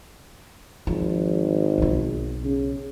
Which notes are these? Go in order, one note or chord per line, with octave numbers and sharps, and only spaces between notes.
G#1 F3
B1 F4
C#3